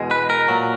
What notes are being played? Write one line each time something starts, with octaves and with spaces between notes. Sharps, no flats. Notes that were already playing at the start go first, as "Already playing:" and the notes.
Already playing: E2 B2 G#3
B4
A#4
A#2 F#3